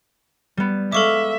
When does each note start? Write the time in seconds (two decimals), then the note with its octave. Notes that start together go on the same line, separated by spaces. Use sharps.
0.57 G3 B3
0.92 G#3 A4 E5 F5 C#6 D6